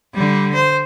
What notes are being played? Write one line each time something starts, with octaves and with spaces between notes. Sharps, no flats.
D3 G3
C5